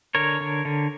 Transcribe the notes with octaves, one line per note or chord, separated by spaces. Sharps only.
D3 A#4 C#5
D3
D3